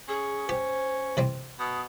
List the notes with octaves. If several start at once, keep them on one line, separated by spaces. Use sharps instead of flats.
C#4 G#4
G4 C5
C3 E3 C4
B2 D#6